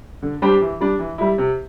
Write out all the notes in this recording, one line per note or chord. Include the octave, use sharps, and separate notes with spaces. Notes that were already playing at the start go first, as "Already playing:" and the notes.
D3
G3 D4 G4 C5
E3
G3 D4
E3
G3 E4
C3